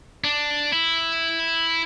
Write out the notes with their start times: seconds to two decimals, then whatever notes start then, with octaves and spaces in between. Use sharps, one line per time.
0.24 D4
0.72 E4